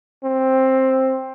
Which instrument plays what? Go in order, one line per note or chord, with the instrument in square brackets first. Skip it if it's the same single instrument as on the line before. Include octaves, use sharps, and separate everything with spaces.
[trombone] C4